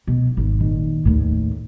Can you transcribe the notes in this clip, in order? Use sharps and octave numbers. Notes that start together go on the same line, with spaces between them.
B2
G#1
A#2 D#3
D#2 A2